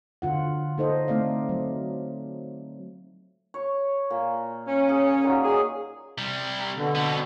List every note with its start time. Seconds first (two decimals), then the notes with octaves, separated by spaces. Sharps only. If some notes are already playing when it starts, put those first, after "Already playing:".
0.22 D3 F4 F#5
0.78 D#4 A4 C5 D#5
1.08 A3 C4 D#4 D5 F5
1.49 F#3
3.54 C#5
4.10 A#2
4.66 C#4
4.89 G#4
5.23 A#2 D#3 F#3
5.43 G#4
6.18 C3 G3
6.76 B2 D3
6.95 B3 C4